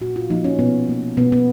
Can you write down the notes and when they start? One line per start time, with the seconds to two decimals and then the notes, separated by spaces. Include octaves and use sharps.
0.01 A#2 F#4
0.16 F4
0.30 F3 A#3 D#4
0.44 C#4
0.59 B2 B3
0.89 A#3
1.17 B2 B3
1.32 B3